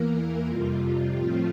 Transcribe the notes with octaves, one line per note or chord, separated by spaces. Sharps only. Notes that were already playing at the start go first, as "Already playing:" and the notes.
Already playing: E2 E3 A#3 A#4
F2 C3 G3 F4
A2 F3 A3 C4 F4